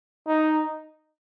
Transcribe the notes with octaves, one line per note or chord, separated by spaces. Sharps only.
D#4